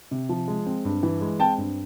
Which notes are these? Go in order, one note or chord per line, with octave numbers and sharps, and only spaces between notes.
C3
F3
G#3
C4
G2
E3
G#3
C4 G5 A5
G2